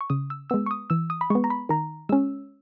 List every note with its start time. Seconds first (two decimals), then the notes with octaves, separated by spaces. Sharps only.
0.01 C#6
0.10 C#3 D#6
0.30 E6
0.50 G#3 B3 E6
0.66 C#6
0.71 D#6
0.90 E3 E6
1.10 D#6
1.21 B5
1.30 G#3 B3 C#6
1.44 A#5
1.50 B5
1.69 D#3 A#5
2.09 G#3 C#4 E6